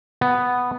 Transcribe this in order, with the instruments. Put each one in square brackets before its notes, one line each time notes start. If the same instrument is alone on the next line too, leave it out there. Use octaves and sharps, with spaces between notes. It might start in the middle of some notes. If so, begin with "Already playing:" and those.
[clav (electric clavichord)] B3